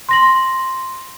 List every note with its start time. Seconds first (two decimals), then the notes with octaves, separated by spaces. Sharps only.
0.09 C6 A#6 F#7